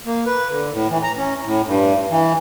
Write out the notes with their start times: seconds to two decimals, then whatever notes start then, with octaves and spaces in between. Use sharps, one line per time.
0.06 A#3
0.26 B4
0.50 D3
0.73 A2
0.90 E3
1.03 A#5
1.18 C#4
1.44 A2
1.66 G2
2.10 E3